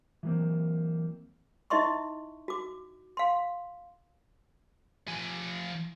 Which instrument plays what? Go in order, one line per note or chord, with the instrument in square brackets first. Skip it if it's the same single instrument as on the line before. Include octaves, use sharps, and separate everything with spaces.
[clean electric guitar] E3 F#3 G3 A#3 C4
[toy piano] D#4 E4 D#5 E5 C6 C#6
F#4 D6
F5 C6
[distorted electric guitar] F3 G#5